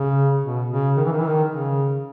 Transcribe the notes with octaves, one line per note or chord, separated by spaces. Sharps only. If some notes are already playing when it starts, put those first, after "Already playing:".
Already playing: C#3
B2
C#3
D#3
E3
D#3
E3
D#3
C#3